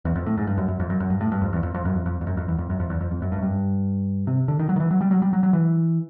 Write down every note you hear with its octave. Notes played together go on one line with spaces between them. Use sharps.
E2
F2
A2
G#2
G2
F#2
F#2
F2
F#2
F#2
G2
A2
G2
F2
E2
F2
F2
F#2
F2
F2
F2
F#2
F2
E2
F2
F#2
F2
E2
F2
F2
F#2
G2
F#2
G2
C3
D3
D#3
F#3
D#3
E3
F#3
G3
F#3
G3
F#3
F#3
E3